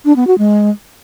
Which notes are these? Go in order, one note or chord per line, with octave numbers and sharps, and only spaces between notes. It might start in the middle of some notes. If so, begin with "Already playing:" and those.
D4
B3
F#4
G#3